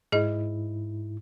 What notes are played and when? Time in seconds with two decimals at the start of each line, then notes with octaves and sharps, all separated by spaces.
0.12 G#2 E4 G#4 D#5